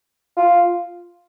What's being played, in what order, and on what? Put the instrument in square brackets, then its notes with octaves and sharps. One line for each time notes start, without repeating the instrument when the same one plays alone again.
[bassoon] F4